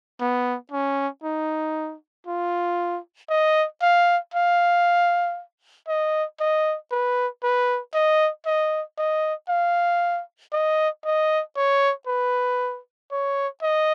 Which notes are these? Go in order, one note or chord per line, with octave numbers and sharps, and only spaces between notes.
B3
C#4
D#4
F4
D#5
F5
F5
D#5
D#5
B4
B4
D#5
D#5
D#5
F5
D#5
D#5
C#5
B4
C#5
D#5